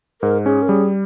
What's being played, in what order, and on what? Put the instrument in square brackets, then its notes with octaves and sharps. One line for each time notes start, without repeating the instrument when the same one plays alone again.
[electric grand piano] G#2 [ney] A#4
[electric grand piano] C#4 [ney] G#4
[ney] A#4
[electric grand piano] G3 [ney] G#4